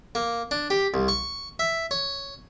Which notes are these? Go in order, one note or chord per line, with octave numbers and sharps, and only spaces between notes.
A#3
D4
G4
C2
C#6
E5
C#5